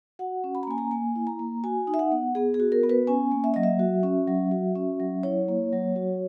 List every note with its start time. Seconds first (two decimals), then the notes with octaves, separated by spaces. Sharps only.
0.19 F#4 F#5
0.44 C#4
0.55 B5
0.63 A#5
0.67 A#3 G#5
0.78 A#5
0.91 A#3 G#5
1.16 E4
1.27 A#5
1.39 A#3
1.64 F#4 G#5
1.87 D#4
1.94 E5
1.99 F#5
2.12 B3
2.35 B3 G#4
2.54 G#4
2.60 F#4
2.72 A#4
2.83 B3
2.89 B4
3.07 C#4 G#5
3.31 A#3
3.44 E5
3.54 F#3 D#5
3.63 E5
3.79 F#4
4.03 C#4
4.27 F#3
4.51 F#4
4.75 C#4
5.00 F#3
5.23 E4 C#5
5.48 A#3
5.73 F#3
5.96 F#4